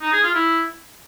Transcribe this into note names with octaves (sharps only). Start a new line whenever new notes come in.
D#4
G#4
F4
E4